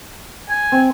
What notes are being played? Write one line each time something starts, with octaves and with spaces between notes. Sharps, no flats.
G#5
C4